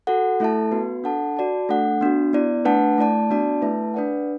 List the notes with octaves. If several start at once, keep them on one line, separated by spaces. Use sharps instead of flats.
F#4 A4 F#5
A3 E4 A4 E5 A5
B3 F#4 B4
D4 A4 F#5 A5
F#4 D5 A5
A3 D4 A4 F#5
B3 D4 F#4
B3 E4 D5
A3 D4 B4 F#5 A5
A3 E4 D5 A5
B3 D4 F#4 D5 A5
A3 E4 B4 E5 A5
D4 B4 D5 F#5